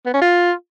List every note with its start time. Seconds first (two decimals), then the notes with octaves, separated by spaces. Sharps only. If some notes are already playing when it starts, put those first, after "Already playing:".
0.06 B3
0.14 C#4
0.22 F4